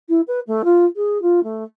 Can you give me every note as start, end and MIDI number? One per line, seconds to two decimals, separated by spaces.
0.09 0.21 64
0.28 0.40 71
0.47 0.62 57
0.64 0.85 65
0.96 1.21 68
1.22 1.43 65
1.43 1.64 57